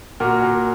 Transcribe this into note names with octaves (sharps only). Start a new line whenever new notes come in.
A#2 F#4 A#4
A#2